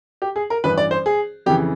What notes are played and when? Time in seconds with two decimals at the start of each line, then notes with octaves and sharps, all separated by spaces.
0.22 G4
0.36 G#4
0.50 A#4
0.64 A1 G2 E3 B4
0.77 D5
0.91 C5
1.06 G#4
1.46 F2 C#3 E3 G4